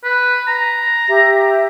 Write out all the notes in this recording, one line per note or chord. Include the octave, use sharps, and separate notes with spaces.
B4
A#5
G4 E5